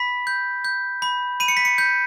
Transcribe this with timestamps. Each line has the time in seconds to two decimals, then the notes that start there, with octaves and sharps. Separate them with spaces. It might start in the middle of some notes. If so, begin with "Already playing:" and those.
Already playing: B5 B6
0.27 G6
0.65 G6
1.02 B5
1.40 B5 D#7
1.48 C#7
1.57 B6
1.65 C#7
1.78 G6